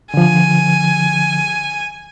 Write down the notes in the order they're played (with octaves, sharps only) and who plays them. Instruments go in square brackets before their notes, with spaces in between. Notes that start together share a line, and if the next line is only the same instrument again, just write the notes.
[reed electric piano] D3 F3 [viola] G#5